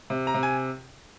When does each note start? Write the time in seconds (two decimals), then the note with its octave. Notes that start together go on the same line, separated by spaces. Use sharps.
0.10 C3
0.27 A#5
0.34 C3
0.43 G#5